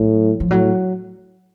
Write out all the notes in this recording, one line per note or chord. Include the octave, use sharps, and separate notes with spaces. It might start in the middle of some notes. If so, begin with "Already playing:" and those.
Already playing: A2 F#3
F3
A2 F#3